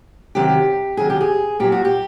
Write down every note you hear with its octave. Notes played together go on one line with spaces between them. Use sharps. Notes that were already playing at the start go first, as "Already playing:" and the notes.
C3 D#3 F#3 G4
C3 D#3 F#3 G#4
G4
G#4
A#2 F#3 G4
F#4
G4